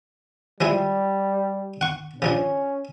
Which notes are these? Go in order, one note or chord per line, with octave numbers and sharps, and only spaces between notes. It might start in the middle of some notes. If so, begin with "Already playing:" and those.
F3 G3 G#3 E4
F#5 C#6
C#3 F3 C#4 D4